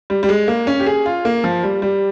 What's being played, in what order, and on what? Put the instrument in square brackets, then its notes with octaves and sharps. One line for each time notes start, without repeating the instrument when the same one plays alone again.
[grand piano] G3
G3
G#3
A#3
C#4
G4
G#4
F4
A#3
F3
G3
G3